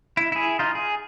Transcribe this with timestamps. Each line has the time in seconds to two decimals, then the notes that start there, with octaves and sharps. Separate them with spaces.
0.17 E4
0.32 E4 G#4
0.59 D#4 F4
0.75 G#4